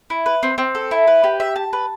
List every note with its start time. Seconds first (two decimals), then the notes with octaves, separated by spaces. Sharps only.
0.10 E4
0.26 B4
0.43 C4
0.58 C4
0.75 A4
0.91 E4
1.07 B4
1.24 G4
1.40 E5
1.56 A5
1.73 B4